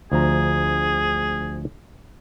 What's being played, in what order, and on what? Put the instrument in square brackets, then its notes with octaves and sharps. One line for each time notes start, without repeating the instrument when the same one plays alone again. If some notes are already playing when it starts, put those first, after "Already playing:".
[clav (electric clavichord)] D2 F3 A#5 [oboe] G#4